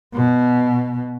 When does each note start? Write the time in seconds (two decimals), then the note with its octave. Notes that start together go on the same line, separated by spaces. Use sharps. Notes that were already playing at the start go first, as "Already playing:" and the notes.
0.14 B2